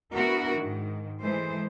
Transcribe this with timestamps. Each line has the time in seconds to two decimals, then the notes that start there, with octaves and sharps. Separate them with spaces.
0.12 B3 D4 E4 F#4 A#4
0.58 G#2 D#3
1.20 E3 G#3 A3 C5